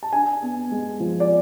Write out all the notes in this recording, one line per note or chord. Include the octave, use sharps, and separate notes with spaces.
A5
D4 G#5
B3
G#3
F3
D5